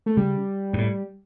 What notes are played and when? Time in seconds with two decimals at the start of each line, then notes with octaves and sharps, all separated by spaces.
0.06 A3
0.17 C#3 G3
0.73 G2
0.78 A2